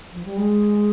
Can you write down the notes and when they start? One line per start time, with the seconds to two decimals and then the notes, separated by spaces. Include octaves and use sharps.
0.12 F3
0.25 G3
0.36 G#3